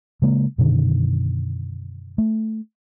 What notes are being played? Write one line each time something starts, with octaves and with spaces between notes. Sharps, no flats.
C#3 G#3 A#3
F#2 B2 D3 D#3
A3